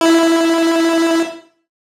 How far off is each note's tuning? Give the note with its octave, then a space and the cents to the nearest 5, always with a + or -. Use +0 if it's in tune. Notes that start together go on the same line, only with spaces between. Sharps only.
E4 +5